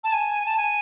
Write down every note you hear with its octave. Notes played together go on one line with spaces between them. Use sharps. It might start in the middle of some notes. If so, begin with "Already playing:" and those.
A5
G#5
A5
G#5